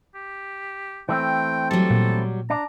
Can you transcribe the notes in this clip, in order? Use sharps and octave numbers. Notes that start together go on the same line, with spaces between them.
G4
E3 A3 C4 G5
F#3 G3 A4
A#2
D4 A#5